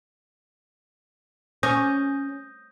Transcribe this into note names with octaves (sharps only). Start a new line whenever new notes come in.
C#4 D#6 G6 A#6